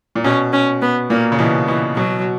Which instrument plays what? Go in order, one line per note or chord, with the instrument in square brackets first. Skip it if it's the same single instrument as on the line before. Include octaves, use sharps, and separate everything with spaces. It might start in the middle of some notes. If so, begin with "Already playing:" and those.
[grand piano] A#2
[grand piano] B2 [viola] C#4
[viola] C#4
B3
[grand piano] A#2 [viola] A#3
[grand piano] C#3
[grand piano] B2 [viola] E3
[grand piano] B2 [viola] E3
[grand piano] B2 [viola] F#3